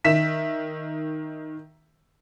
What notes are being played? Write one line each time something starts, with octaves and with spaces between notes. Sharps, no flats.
D#3 E5 B6 E7